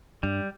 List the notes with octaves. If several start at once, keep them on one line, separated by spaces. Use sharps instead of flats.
G2 G3